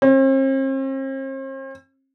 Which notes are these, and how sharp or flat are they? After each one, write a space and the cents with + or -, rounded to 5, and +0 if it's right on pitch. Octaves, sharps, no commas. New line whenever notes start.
C4 +45